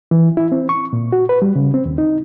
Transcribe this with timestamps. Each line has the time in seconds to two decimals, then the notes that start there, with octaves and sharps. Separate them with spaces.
0.11 E3
0.37 E4
0.52 C4
0.69 C#6
0.93 A#2
1.12 F#4
1.29 B4
1.42 G3
1.56 C#3
1.74 C4
1.86 D#2
1.98 D#4